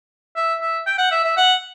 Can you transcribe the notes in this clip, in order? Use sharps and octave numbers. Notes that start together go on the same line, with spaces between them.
E5
E5
G5
F#5
E5
E5
F#5